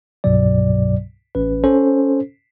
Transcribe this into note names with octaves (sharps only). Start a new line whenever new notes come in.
C2 G2 B2 F#3 D5
A1 C#4 B4
C#4 A4 C5